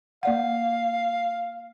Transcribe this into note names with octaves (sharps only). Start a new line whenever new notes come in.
A#3 D5 F5 F#5